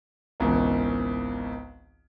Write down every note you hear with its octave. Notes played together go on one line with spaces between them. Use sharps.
G#1 C#2 B2 E3